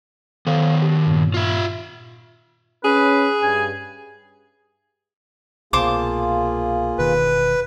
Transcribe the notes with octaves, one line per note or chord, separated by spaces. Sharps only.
D#3 B3 A4 C5 F5
G4
G2 A#2
F4 E5
C#4 G#4 B4
G2 G#5
C2 B2 A#3 F4 G#4 C5 A5 D6
E1 B2 D#3 B4